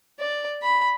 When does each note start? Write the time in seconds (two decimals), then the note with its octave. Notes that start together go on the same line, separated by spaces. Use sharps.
0.19 D5
0.62 B5